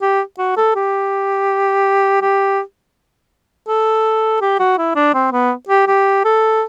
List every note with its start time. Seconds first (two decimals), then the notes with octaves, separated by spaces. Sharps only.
0.02 G4
0.39 F#4
0.57 A4
0.76 G4
2.22 G4
3.68 A4
4.41 G4
4.59 F#4
4.78 E4
4.96 D4
5.14 C4
5.32 B3
5.69 G4
5.87 G4
6.25 A4